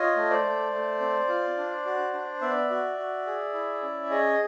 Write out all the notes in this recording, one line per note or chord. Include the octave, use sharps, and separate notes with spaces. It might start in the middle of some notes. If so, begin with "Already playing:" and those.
Already playing: F4 C#5 D#5
A3
C5 D5
A3
A3
C4
F4
D4
F#4
D4
B3 D5 E5
F#4
F#4
G#4
E4
C#4
G#4 C#5 D#5